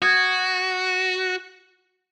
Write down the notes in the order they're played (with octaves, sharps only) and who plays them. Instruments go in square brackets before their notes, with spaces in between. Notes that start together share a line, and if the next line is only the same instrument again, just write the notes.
[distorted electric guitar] F#4 [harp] D#6 G#6